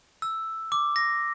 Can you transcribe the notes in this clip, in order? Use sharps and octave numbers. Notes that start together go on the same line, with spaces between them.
E6
D6
A#6